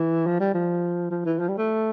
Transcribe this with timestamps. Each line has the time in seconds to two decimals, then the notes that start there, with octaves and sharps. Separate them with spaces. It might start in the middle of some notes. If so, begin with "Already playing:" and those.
Already playing: E3
0.26 F3
0.40 G3
0.54 F3
1.11 F3
1.25 E3
1.39 F3
1.49 G3
1.58 A3